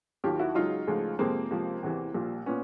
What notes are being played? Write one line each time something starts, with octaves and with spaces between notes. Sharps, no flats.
D#2 D#3 F#3 F4 G4
E4 F#4
C#2 C#3 F#3 D#4 F4
D2 C#3 F3 G#3
F2 C3 F3 G#3 A#3 C4
C#2 C3 F3
E2 C3 E3
A#1 A#2 G3
A#2 B3 C#4